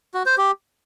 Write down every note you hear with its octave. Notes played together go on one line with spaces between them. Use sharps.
F#4
C5
G4